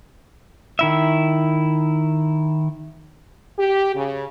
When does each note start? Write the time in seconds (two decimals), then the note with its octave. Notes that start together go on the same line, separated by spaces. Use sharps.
0.79 D#3 E4 E5
3.58 G4
3.94 C#3